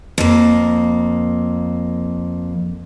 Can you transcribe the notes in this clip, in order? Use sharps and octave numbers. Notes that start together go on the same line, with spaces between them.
F2 A#3